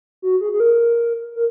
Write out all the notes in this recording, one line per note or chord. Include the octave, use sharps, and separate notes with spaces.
F#4
G#4
G#4
A#4
A#4